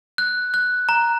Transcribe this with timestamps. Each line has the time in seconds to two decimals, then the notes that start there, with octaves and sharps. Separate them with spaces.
0.18 F#6
0.54 F#6
0.89 A#5